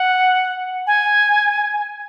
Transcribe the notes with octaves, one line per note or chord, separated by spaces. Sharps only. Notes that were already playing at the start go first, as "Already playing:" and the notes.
Already playing: F#5
G#5